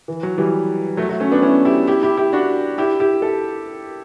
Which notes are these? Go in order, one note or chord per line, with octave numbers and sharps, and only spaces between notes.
E3
F#3
E3 G3
F#3 A3
F#3 A3
A3 C#4
B3 D4
C#4 E4
E4 G4
E4 G4
E4 G4
E4 G4
D4 F#4
E4 G4
E4 G4
A4